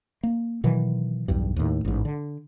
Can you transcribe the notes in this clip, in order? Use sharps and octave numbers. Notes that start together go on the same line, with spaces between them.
A#3
B2 D#3 E3 F#3
B1 E2 G2
D#2 A2
A1 G#2
D3